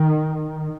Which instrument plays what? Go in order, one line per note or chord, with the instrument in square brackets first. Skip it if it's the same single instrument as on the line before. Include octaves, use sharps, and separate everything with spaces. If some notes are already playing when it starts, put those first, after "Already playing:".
Already playing: [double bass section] D#3